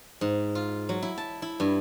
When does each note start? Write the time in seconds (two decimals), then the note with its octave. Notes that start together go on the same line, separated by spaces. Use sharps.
0.21 G#2
0.55 F4
0.89 F#3
1.02 E4
1.18 A5
1.42 E4
1.60 G2